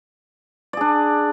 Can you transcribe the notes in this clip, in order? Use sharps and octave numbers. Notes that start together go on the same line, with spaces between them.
D4 G#4 D5